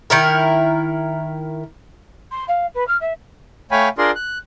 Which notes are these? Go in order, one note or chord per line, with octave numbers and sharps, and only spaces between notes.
D#3 E4 A#4
C6
F5
B4
F6
E5
A3 C#5 F5 G5 G#5 B5
D4 F4 G#4 A#4 D5 C6
F#6